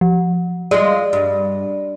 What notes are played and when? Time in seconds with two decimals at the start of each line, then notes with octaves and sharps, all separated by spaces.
0.01 F3
0.71 G#3 F4 D5
1.13 G2